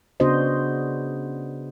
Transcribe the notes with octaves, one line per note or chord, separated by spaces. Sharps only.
C#3 B3 D4 F#4 C5 D#5